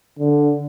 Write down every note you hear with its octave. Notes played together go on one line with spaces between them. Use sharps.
D3